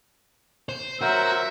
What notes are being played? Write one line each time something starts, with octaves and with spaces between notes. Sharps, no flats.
C5
F#3 F#4 A#4 C5 E5